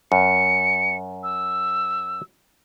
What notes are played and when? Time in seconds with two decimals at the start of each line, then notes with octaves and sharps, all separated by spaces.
0.12 F#2 C#7
1.23 E6